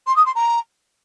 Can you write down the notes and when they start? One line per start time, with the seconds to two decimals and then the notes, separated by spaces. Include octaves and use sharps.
0.06 C6
0.16 D#6
0.26 C6
0.35 A#5